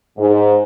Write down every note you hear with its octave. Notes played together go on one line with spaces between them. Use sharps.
G#2